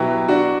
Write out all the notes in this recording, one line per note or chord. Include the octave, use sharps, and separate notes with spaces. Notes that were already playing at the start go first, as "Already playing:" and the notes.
Already playing: B2 F#3 E4 G4
D4 F#4